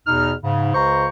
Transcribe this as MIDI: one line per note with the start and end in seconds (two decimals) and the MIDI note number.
0.07 0.34 40
0.07 0.34 47
0.07 0.34 63
0.07 0.34 89
0.44 0.73 44
0.44 0.73 49
0.74 1.09 37
0.74 1.09 49
0.74 1.09 72
0.74 1.09 82
0.74 1.09 85